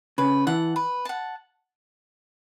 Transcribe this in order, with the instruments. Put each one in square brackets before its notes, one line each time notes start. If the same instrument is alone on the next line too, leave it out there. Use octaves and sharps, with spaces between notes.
[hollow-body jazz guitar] C#3 [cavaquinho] B4
[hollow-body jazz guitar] E3 [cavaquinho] F#5 A5
[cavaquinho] B4
F#5 A5